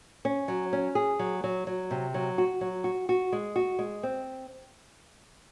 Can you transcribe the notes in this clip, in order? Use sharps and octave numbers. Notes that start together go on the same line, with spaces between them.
C#4
F#3
C#4
G#4
F#3
F#3
F#3
C3
F#3
F#4
F#3
F#4
F#4
G#3
F#4
G#3
C4